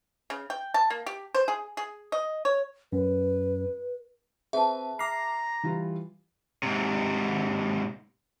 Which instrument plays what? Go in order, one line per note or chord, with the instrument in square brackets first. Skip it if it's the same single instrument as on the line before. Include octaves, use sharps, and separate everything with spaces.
[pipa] C#3
G5
A5
A#3
G4
C5
G#4
G#4
D#5
C#5
[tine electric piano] F#2 [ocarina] B4
[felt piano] C4 B4 [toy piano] G#4 A5 [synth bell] E5
[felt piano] E5 F6 [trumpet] A#5 [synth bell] D6 C7
[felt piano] E3 G3 F4
[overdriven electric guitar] G#2 C3